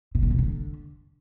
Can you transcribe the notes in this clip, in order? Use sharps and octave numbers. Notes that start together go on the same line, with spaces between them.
C3
B2
E2
D3